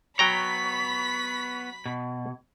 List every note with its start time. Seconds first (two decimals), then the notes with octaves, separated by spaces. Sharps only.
0.19 F#3 B3 C#5 G5 A#5 B5 B6
1.86 B2